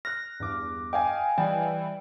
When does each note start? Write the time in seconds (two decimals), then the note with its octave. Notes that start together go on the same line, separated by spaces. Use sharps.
0.05 F6 F#6 A#6
0.40 E2 G2 D6
0.93 D#5 F5 G5 G#5
1.38 E3 G3 D5 G5